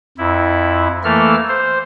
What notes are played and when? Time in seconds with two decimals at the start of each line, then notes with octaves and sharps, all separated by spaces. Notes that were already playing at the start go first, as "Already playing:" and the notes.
0.18 F2 E4
1.04 E3 A3 A#3 A4 F6
1.48 C5